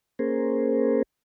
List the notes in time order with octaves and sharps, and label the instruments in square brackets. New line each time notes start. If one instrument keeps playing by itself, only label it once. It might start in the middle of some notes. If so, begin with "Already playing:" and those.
[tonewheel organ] A#3 C#4 G#4 A#4 C5